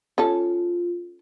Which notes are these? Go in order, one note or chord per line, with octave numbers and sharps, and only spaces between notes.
C#4 F4 A4